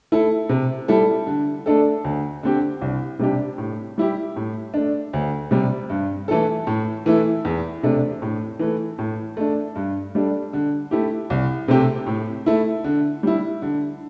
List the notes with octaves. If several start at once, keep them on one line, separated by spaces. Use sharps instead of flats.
A3 E4 A4
C3
G3 E4 A4
D3
A3 D4 A4
D2
D3 C4 G4
C2
C3 G3 D4 G4
A2
G3 E4 G4
A2
A3 D4
D2
C3 G3
G2
E3 A3 E4 A4
A2
E3 A3 E4
E2
C3 A3 D4
A2
E3 A3
A2
A3 D4
G2
G3 D4 A4
D3
A3 E4 G4
C2
C3 A3 C4 G4
A2
A3 E4
D3
G3 E4
D3